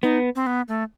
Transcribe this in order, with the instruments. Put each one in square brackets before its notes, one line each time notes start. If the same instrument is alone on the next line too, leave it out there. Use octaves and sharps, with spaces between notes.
[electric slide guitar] B3 [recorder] D#4
[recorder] C4
B3
A3